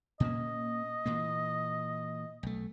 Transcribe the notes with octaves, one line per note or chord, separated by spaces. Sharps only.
A#2 A#3 C#4 D#5
A#2 E3 A#3
B1 A3